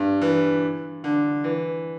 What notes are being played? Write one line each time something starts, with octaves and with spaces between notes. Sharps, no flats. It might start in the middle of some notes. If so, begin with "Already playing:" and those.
Already playing: G2
E3
D3
E3